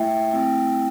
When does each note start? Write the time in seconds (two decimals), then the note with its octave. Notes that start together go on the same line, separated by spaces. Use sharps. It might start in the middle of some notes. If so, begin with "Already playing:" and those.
Already playing: A3 E4 E5 G5
0.31 A3 C4 E4 G5